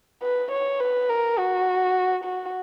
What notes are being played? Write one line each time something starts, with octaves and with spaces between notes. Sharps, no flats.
B4
C#5
B4
A#4
F#4
F#4